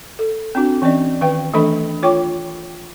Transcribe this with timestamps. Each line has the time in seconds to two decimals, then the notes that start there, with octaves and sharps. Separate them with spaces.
0.19 A4
0.55 C4 D4 F#4
0.82 E3 C4 C#4 D5 D#5
1.21 D#3 B4 F5 G5
1.53 E3 A3 D4 A4 D#5 B5
2.03 F4 C#5 G5 C#6 D6